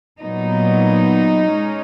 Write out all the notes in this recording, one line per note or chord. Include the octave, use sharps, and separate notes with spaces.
A#2 F#3 B3 D#4
G#3 C#4